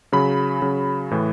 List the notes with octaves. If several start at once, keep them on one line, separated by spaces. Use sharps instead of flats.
C#3 F#3 B5
C#3 F#3
A2 E3